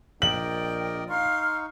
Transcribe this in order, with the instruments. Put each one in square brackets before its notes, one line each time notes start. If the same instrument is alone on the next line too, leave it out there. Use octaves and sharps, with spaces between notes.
[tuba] A#1 [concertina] A#4 D5 D#5 [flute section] G5 [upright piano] F#7
[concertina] D#4 C#6 [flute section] F5 C6 F6